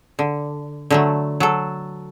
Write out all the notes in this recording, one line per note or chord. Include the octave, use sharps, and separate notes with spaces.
D3
D3 F#3 A3
F#3 A4